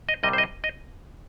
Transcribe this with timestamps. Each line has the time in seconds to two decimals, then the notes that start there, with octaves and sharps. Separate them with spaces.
0.09 D#5
0.23 C2 C3 G3 D#5
0.33 C5
0.38 D#5
0.64 D#5